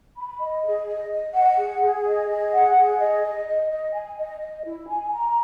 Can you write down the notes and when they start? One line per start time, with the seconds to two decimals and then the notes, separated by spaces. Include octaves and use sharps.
0.16 B5
0.39 D#5
0.64 G#4
0.86 D#5
1.10 D#5
1.33 F#5
1.58 G#4
1.81 G#4
2.05 D#5
2.29 G#4
2.51 F#5
2.76 G#4
3.00 D#5
3.23 D#5
3.46 D#5
3.70 D#5
3.94 G#5
4.18 D#5
4.41 D#5
4.64 E4
4.88 G#5
5.12 A#5